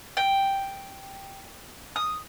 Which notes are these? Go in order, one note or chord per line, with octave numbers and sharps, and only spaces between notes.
G5
D#6